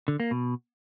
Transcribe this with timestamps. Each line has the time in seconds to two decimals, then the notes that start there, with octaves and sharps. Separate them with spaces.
0.08 D3
0.20 A#3
0.31 B2